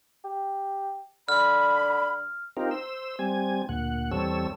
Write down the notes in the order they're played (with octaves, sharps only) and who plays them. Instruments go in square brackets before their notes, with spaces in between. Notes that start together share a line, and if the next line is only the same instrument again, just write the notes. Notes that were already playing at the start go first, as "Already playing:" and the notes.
[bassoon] G4
[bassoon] D3 [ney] B5 [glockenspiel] F6
[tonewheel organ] C4 D#4 F4 G4 A#4
C5 E6
G3 C4 G#5
D2 A#2 F#5
E2 G3 C4 A4 C#5 E6